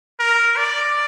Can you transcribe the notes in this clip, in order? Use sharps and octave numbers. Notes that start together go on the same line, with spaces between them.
A#4
D5